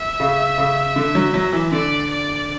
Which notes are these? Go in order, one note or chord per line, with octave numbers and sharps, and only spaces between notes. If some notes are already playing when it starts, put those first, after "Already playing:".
Already playing: E5
C#3
C#3
D3
F#3
F#3
E3
D3 D5
D5